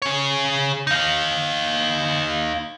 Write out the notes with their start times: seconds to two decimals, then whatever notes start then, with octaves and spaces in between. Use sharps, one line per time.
0.02 G#4 C#5
0.87 D#4 F5